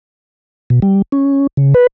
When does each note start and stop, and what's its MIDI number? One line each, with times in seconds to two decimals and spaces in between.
0.70 0.80 47
0.82 1.02 55
1.12 1.47 61
1.57 1.74 49
1.74 1.87 71